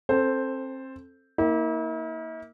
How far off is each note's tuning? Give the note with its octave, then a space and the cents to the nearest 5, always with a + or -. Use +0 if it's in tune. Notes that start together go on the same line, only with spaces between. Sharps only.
C4 +30 A4 +5 C5 +0
A#3 +0 E4 -45